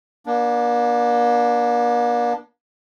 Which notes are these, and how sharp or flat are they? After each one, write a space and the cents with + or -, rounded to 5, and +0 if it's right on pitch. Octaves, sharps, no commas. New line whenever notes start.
A#3 +40 D4 +0